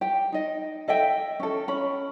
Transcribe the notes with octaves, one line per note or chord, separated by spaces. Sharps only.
G4 G5
D#4 D#5
A4 D#5 E5 G5
C#4 A4
C#4 B5